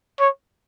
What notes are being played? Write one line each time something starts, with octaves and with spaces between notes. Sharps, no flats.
C#5